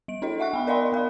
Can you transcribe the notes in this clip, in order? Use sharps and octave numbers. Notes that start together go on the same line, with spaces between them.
G3 D7
D4 E4 A4 D#5
E5 F#5 C#6 F#6
B3 B5
A#4 D5 D#5 F5 B5 C6
B3 A#4 F5 B5